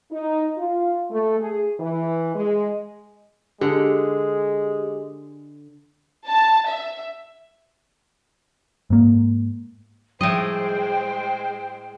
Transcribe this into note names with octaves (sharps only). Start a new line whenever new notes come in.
D#4
F4
A3
G#4
E3
G#3
D3 G#3 G4
A5
E5
G#2 A#3
A2 D#3 F3 G3 G#3 C5 D#5 G5